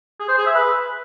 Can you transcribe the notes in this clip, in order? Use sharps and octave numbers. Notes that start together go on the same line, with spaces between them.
G#4
C5
G#4
E5
B4